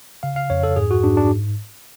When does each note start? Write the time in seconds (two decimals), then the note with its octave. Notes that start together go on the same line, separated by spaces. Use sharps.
0.23 C#3 F5
0.36 F5
0.50 F2 C#5
0.63 A4
0.76 G#2 G#4
0.91 F#4
1.04 G#2 D4
1.17 D4